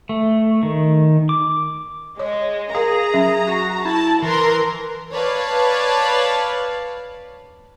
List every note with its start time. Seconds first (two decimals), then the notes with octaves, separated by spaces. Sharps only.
0.09 A3
0.63 D#3
1.29 D6
2.19 G#3 C#5
2.75 G#4 A#4 F5 A#5
3.14 F#3 C#4 E5
3.47 F#4
3.85 E4 A5
4.22 E3 A#4 C6
5.12 B4 C#5 D5 F5 A5